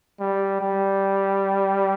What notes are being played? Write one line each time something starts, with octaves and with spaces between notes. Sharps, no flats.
G3
G3